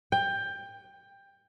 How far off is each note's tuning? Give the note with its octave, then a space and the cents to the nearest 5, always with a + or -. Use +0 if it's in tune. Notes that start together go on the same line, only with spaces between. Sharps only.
G5 +15